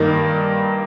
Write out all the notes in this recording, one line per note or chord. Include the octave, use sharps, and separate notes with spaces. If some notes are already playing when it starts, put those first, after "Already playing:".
Already playing: G2 D#3 A#3 D#4